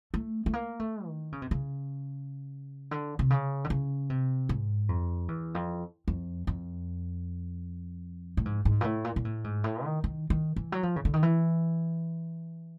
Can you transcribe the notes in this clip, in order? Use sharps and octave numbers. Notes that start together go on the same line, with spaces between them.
A3
A3
A#3
A3
D#3
C#3
C3
C#3
D3
C3
C#3
D3
C#3
C3
G#2
F2
E2
F2
F2
F2
A2
G#2
G#2
A#2
A2
A#2
A#2
A2
G#2
A2
D#3
D#3
D#3
E3
F#3
F3
C#3
D3
D#3
E3